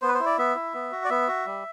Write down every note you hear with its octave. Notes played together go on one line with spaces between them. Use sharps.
B3 C5
B4
C5
E4
D5
B3 E5
E4
B3
F#4
D5
B3 E5
F#4
G3